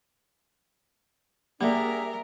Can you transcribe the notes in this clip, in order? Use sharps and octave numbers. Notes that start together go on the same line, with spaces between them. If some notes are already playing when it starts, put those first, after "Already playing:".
G3 A#3 D4 G#4 A#4 E5